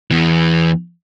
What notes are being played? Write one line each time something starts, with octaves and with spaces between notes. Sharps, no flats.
E2 E3